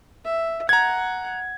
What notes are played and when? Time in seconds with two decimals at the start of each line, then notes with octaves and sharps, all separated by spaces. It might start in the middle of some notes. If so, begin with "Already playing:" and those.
0.25 E5
0.69 F#5 A#5 G#6